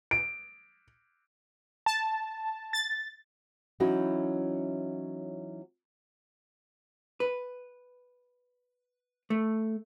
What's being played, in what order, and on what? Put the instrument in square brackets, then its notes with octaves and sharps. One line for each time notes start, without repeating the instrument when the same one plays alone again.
[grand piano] D7
[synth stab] A5
A6
[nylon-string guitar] E3 F#3 C#4 D#4 E4 F#4
[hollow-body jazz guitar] B4
A3